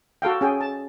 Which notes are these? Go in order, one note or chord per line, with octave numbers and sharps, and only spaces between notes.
F#4 A4 F5 G5
C#4 G#4 G5
A5